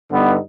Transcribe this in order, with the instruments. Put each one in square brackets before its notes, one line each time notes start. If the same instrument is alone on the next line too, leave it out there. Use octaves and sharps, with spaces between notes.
[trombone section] G2 D3 G3 B3 D#4